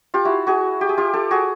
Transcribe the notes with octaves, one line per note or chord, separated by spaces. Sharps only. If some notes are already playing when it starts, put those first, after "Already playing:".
F4 G4
E4 F#4
F#4 G#4
G4
G#4
F4 G4
G4 A4
F#4 G#4